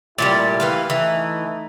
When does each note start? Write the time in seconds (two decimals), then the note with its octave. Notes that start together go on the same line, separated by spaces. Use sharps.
0.18 A#2 E3 G3 A3 E4 G4
0.60 E3 B4 F5
0.90 E3 A3 D#4